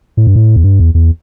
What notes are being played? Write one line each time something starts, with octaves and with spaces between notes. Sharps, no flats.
A2
G2
A2
E2
G2
E2
E2